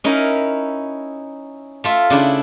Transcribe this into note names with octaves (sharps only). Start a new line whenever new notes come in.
C#4 D#4 E4 A#4
A3 F4 E5
C#3 D4 E4